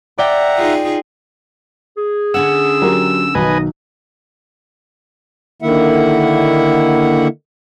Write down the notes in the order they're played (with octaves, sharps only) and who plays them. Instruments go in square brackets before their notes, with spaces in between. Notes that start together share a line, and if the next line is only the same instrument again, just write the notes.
[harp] D5 G5 [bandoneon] E5 F#5 A#5
[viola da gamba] D#4 F4 G#4
[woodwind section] G#4
[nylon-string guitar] D3 C#4 F#5 [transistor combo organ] E6
[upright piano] F#3 G4 A#4
[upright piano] B1 D#3 F#3 [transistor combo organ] B4 G#5 [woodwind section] D#5
[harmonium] D3 D#3 A#3 E4 E5 F#5